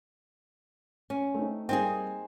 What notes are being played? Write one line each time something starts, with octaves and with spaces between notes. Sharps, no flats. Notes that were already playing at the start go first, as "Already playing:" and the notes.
C#4
A3 C4 D#4
G3 A#3 C4 D#4 G#4 G#5